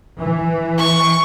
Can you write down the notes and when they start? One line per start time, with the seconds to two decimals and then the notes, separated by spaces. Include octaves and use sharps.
0.19 E3
0.78 C#6